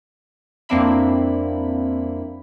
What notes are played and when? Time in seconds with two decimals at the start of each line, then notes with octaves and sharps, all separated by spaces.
0.69 F2 A#3 C4 D4 E4 B5